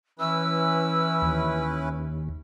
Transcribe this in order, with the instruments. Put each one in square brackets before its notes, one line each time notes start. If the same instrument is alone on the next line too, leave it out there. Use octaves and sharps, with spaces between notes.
[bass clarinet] E3 [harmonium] C#4 E4 B4 [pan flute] E6
[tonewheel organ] D#2